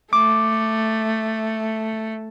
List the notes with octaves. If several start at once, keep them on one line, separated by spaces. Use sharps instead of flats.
A3 D6